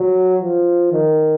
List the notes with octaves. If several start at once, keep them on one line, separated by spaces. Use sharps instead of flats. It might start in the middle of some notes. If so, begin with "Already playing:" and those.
Already playing: F#3
F3
D#3